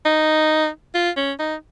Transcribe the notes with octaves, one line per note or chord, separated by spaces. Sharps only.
D#4
F4
C#4
D#4